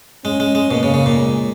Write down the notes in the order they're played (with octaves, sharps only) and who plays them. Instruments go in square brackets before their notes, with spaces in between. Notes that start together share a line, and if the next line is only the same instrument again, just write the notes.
[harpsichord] G#3 [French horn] C#4
[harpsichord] G#3
G#3
[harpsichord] B2 [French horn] A#3
[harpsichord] C#3
C#3
A#2
[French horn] G#3